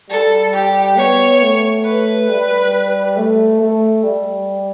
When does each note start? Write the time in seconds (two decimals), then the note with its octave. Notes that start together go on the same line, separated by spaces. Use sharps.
0.10 G3 A4
0.54 G4
0.97 B3 C#5
1.41 A3
1.85 B4
2.29 G3
3.17 A3
3.60 A3
4.04 G3